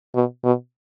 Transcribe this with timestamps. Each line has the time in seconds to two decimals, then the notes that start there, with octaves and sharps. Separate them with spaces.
0.15 B2
0.44 B2